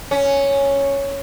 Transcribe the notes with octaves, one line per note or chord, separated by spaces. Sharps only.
C#4